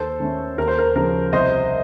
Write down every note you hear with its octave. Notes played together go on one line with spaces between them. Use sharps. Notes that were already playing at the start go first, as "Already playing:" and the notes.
Already playing: D#2 A4 C5
D#3 A3 C#4
D#2 A#4
C5
A#4
C#3 F3 A#4
C2 C5 D#5